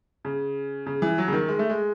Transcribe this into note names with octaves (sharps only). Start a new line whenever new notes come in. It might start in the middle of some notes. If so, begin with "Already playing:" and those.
C#3
C#3
E3
F#3
C#3
D#3
G#3
A3
G#3